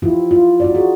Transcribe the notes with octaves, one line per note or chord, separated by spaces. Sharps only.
F3 E4 F4 G4
F4
D#4 F#4 D5
F#4 G#4